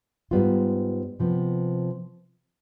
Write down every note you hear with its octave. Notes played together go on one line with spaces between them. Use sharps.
G#2 G3 B3 F4
C3 F3 B3